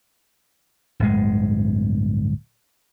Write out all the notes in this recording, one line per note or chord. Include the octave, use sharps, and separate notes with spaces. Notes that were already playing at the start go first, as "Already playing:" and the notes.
D1 G1 G#3